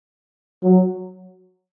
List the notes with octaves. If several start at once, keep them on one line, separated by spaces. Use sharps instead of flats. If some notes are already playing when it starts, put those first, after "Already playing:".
F#3